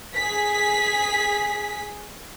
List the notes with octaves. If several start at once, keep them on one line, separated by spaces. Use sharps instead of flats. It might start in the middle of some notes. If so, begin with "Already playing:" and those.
G#4 B6